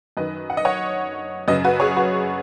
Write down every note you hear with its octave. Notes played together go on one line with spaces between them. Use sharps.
F#2 D#3 B4 D#5
F#5
D#5
C#5 F#5
F#2 C#3 B4 D#5
F#4 B4
G#4 C#5
F#4 B4